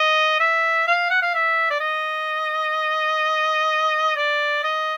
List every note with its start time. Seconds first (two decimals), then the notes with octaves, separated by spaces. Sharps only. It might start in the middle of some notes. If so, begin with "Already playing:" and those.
Already playing: D#5
0.40 E5
0.87 F5
1.10 F#5
1.22 F5
1.35 E5
1.70 D5
1.80 D#5
4.16 D5
4.64 D#5